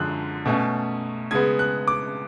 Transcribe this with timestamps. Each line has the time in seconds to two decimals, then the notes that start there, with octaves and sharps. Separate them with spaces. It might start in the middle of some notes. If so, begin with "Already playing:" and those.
Already playing: F#2 D3 F3 G#3 F#6
0.46 B2 A3 C#4
1.31 C#3 G#3 B3 G#6
1.59 F#6
1.88 D6